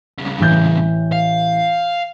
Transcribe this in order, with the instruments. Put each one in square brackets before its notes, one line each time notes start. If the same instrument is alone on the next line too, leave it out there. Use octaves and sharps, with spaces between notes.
[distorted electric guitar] C2 C#3
[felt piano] A1 E3 G6
[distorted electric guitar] F5